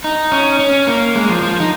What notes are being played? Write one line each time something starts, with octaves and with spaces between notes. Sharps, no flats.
D#4
C#4
C#4
A#3
G#3
F3
F3
D#4